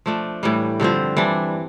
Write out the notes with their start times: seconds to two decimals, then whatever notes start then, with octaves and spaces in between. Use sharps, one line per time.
0.06 F3 A3 D4
0.43 A2 E3 G3
0.80 G2 D3 F3 C4
1.17 E3 G3 D4